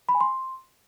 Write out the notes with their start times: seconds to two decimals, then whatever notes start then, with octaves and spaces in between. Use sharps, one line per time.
0.09 B5
0.15 G#5
0.21 C6